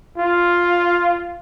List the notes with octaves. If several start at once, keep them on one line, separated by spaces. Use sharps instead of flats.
F4